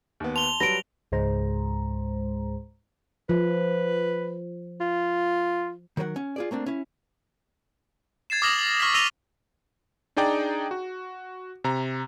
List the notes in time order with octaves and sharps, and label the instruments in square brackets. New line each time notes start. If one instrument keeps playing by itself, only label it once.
[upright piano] D#2 B3
[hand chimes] A5 C6 [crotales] F7 G7
[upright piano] F#3 G3 B4 [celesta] A#6 D7
[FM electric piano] C#2 G#2 G#3 C5 A#5
[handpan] F3 [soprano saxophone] B4
[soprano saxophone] F4
[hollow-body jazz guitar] D#3 F#3 A#4 B4 F#5
C#4
F4 G#4 D5
A3 A#3 C4 D4
C#4 E4
[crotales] G#6 A6 C7 E7
D6 D#6 F6 A#6 E7 F#7
F#7
C#6 F6 G#6 A#6 B6
E6 A#6 D#7 F7 G7
[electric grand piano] D4 D#4 G#4 D5 G5 A#5
F#4
C3 A#5